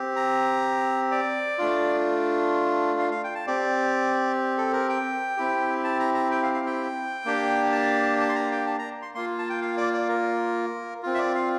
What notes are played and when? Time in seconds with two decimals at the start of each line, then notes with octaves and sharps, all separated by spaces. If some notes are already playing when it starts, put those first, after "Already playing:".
Already playing: C4 G4
0.16 A#5
1.12 D5
1.58 A3 D4 F4
2.99 F5
3.11 F5
3.24 G5
3.35 A5
3.47 C4 G4 D5
4.58 A4
4.73 A#4
4.89 G5
5.37 C4 E4 G4
5.84 A5
6.00 A#5
6.14 A#5
6.31 G5
6.43 F5
6.54 F5
6.66 G5
7.25 A#3 D4 G4
7.72 A5
8.20 A5
8.29 C6
8.35 A#5
8.52 G5
8.66 A5
8.79 A#5
9.02 C6
9.14 A#3 F4 C6
9.38 A5
9.49 G5
9.61 F5
9.77 D5
9.94 D5
10.09 A#4
11.03 C4 F4
11.14 E5
11.18 D5
11.35 F5